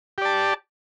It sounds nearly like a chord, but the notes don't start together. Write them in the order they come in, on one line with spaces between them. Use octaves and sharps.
G4 D5 A5